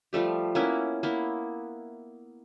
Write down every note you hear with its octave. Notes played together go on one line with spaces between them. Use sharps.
F3 G3 A3 G4
A#3 B3 C#4 E4
A#3 B3 E4